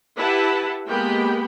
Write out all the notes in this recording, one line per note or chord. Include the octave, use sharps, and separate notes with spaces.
E4 G4 B4 E5 F#5 A5
G#3 A#3 B3 G4 G5 B5